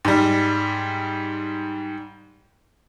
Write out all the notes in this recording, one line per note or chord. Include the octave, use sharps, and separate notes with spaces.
G#2 G3